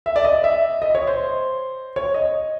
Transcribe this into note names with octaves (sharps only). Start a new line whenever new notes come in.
E5
D5
D#5
E5
D#5
C#5
C5
C#5
D#5